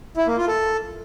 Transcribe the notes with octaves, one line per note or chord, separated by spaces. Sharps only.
E4
A#3
F4
A4